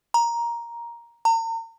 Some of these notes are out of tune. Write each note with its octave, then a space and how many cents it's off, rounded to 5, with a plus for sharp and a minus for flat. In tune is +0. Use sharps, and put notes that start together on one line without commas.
A#5 +10
A#5 -40